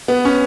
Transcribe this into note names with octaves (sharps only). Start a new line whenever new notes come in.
B3
C#4